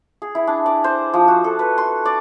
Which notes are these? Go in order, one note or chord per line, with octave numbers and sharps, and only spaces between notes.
G#4
E4
D4
D5
C5
F3
F#4
A4
B4
C6
D5